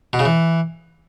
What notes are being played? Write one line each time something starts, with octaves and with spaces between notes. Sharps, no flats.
B2
C#3
E3